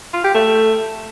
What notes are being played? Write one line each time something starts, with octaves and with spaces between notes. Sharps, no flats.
F4
G4
A3